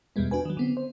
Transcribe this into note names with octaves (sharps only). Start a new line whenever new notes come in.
E2 B2 G3 G#3 B3
D4 F#4 B4 G#5
D#3 F#3
D3 B3 C4
C5